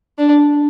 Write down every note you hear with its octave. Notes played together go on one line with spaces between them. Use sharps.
D4